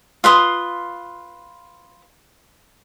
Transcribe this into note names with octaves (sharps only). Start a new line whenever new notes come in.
F4 B4 C6 D#6